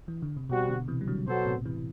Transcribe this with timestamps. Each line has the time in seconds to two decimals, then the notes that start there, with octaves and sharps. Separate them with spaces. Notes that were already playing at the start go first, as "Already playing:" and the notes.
0.08 E3
0.22 D3
0.37 C3
0.49 B2 G3 C4 F#4
0.69 B2 D3
0.88 C3 E3
1.01 G3
1.07 D3 F#3
1.27 B2 F#3 B3 F#4 A4 C5
1.45 A2 C3
1.65 C3 E3